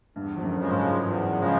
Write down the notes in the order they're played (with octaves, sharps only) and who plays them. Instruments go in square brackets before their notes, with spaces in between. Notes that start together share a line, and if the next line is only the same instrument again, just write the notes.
[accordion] E2 [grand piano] G2
[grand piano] F2
F#2
[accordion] C#3 F3 G#3
[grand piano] G#2
[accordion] E2
C#3 F3 G#3